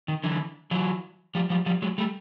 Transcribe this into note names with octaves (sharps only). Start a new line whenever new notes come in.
D#3
D3 E3
E3 F#3
F3 G3
F3 G3
F3 G3
F#3 G#3
G3 A3